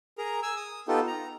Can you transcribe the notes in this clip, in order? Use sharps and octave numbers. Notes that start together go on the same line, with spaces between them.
G#4 A#4 A#5
G#5 E6
D#6
B3 D#4 F4 G4 A4
A#5